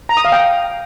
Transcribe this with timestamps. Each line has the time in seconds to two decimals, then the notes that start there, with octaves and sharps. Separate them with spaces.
0.09 A#5
0.17 D#6
0.25 F5
0.32 G5